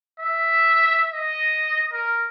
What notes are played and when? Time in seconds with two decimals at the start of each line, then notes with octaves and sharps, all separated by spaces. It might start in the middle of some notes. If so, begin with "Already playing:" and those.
0.20 E5
1.13 D#5
1.93 A#4